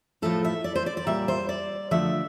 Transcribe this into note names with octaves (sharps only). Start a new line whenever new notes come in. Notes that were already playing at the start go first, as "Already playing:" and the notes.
A2 F3 A3 A4
E5
D5
C5
D5
D5
A#2 G3 A#3 E5
C5
D5
D3 F3 A3 E5